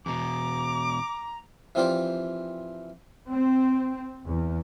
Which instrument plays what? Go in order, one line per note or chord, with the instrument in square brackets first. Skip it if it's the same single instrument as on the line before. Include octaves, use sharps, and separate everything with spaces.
[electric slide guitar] E2 B2 [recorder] A#5 [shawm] D6
[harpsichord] E3 F3 C4 F4 G4 D5
[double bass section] C4
E2